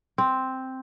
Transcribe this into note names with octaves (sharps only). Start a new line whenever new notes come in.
C4